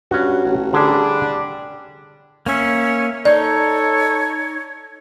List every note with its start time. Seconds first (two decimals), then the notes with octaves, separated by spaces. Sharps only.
0.11 G2 C#4 F#4
0.45 A1
0.73 D3 G3 D4 G#4
2.46 A#3 C#4 E5
3.25 D#4 A4 C#5 D5